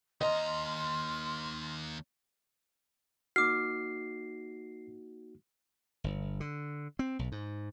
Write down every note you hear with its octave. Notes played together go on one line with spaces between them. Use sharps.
D#2 D#5 A#5 C6 F6
A#3 D#4 F#4 D6 F6 C7
G1
D3
C4
B1
G#2